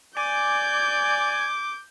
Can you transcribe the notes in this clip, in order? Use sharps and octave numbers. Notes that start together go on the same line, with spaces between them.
D5 G#5 D6 G6